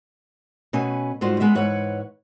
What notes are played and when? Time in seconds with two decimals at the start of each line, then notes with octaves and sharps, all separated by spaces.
0.73 B2 A3 C#4 B4 G#5
1.21 G#2 G3 A3 F4 F#4 C5
1.40 G#3 B3 E5
1.55 G#2 E3 B4 C#5 F#5